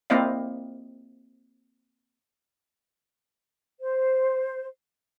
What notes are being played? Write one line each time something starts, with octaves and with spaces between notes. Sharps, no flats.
A#3 C4 E4 D5 D#5 F5
C5